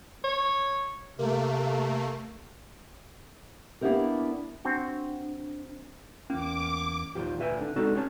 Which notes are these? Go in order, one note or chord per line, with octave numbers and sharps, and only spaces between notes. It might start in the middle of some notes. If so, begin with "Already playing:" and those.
C#5
C3 A3 A#3
A#3 B3 D4 E4 G4 A#4
C4 D4 F#4
E2 A#3 C#4 D6
D#2 A#2 F3 G4
D2 A#2 B4 E5 G5 G#5
D3 D4
G#3 C4 D4 D#4 F#4 A4
C#4 G4 C#5 A5